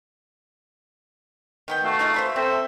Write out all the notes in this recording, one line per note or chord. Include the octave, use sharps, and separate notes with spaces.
D#3 B3 G5
A3 F#4 F5
D#4 F4 G#4
C5 E5 B5
C4 A4 C5 E5